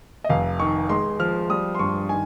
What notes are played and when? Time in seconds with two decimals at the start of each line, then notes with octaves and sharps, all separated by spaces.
0.24 D#5
0.29 F1 F5
0.59 D#3 C#6
0.89 G#3 C6
1.19 F3 F6
1.49 G3 D#6
1.75 C6
1.79 G2 C#6
2.09 D#3 G#5